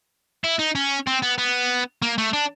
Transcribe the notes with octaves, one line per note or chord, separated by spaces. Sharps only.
E4
D#4
C#4
C4
B3
B3
A#3
A3
D4